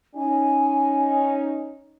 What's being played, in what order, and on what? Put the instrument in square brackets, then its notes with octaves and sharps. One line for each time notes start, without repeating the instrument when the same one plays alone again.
[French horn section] C#4 D#4 [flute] G#5